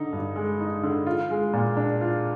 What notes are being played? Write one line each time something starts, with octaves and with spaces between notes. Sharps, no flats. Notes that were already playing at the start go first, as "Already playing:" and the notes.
Already playing: D3 D#4
G2
G#3
D#4
D3
F4
G#3
A#2
D4
F4